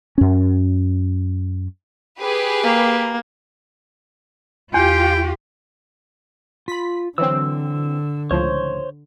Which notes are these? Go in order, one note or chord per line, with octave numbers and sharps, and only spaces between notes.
F#2 C#4
G4 G#4 B4
A#3
E2 F4 G4 G5
F4 B5 B6
D3 E3 F#3 C4 E6
C#2 A2 F3 C5 C#5